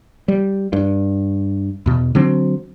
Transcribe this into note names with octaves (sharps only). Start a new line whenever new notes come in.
G3
G2
E2 B2
D3 F#3 C4